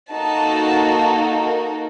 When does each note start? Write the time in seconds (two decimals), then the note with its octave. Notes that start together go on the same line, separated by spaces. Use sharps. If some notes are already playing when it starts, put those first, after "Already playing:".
0.11 A#3 D#4 F#4 A4 A5
1.36 A#4